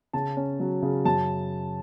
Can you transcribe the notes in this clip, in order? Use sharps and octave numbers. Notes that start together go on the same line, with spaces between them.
C#3 A5
C#4
F#3
C#3
F#2 A5